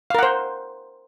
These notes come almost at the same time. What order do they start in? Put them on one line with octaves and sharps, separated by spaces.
F5 A#4 F#5 C5